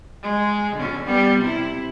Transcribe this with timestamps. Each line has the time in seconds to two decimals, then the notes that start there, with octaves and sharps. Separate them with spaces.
0.23 G#3
0.76 D3 C#4
1.04 G3 B3
1.41 C3 E4